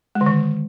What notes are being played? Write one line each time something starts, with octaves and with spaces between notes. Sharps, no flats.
G#3
D3
D#3